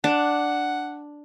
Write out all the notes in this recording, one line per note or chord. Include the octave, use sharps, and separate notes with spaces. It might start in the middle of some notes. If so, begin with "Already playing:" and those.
D4 F#5